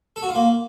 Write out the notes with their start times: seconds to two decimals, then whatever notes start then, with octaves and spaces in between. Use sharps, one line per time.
0.16 A4
0.23 F#4
0.29 F4
0.35 A#3